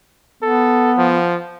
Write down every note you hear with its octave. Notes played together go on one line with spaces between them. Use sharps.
B3 A4
F3